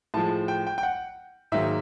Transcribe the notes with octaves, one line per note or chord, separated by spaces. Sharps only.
A2 F3 G#3 A5
G5
G5
G5
F#5
G#2 D#3 F#3 A#3 E5